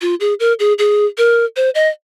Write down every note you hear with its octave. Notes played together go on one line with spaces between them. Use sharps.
F4
G#4
A#4
G#4
G#4
A#4
C5
D#5